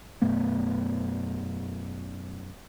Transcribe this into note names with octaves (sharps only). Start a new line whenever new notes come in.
F#2 B2 A3 B3